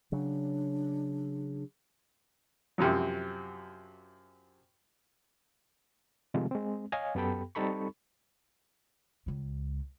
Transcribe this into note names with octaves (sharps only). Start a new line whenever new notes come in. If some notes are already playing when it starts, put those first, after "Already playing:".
C#3 F#3 D4
F#2 C3 F3 F#3
C3 D#3 F3 G#3 A3 C4
G#3 C4
C#5 D#5 F5 G#5
F#2 B3 G4 A4 G5 B5
G3 C4 D#4 A4 B5 C#6
C#2 G#3